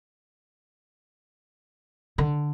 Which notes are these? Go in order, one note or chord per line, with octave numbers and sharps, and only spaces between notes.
D3